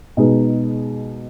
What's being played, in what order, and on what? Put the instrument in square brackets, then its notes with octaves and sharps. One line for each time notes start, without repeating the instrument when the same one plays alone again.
[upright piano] B2 G#3 D#4 G#4 B4